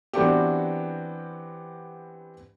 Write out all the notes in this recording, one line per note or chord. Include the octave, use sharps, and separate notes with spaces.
E3 B3 C4 D4 F#4 G4